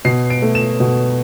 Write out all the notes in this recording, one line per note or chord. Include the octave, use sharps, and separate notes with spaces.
B2 C7
D7
A3
E7
B2